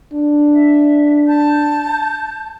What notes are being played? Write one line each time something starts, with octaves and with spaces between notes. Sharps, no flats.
D4
E5
A5 G6